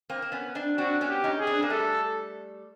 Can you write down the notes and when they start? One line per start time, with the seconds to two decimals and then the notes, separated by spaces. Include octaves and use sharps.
0.10 A#3 C4
0.22 C4
0.32 B3 C#4
0.55 C4 D4
0.78 C4 D4 F#4
1.01 B3 C#4
1.09 G4
1.24 C#4 D#4
1.39 G#4
1.47 C4 D4
1.62 A#3
1.70 G3 A3 A4